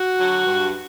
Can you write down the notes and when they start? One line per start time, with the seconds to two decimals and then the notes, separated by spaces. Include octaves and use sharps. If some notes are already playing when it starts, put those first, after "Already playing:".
Already playing: F#4
0.19 D3 F#3
0.46 G2